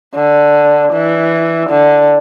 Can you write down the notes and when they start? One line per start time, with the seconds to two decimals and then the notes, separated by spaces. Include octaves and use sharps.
0.15 D3
0.93 E3
1.70 D3